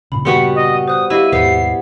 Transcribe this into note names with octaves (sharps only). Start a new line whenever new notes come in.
G2 A#2 C#3 B5
G3 B3 F#4 C6 C#7
D#5
C5 D#6 F#6
E4 G4 D#5 F5 D#7
D#2 G#2 B2 B3 C5 C7